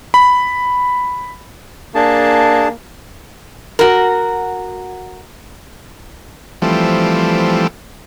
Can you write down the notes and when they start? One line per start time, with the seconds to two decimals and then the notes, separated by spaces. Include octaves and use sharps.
0.14 B5
1.95 A#3 D4 G#4 A5
3.79 F#4 A#4
6.62 E3 F3 G3 A3 C4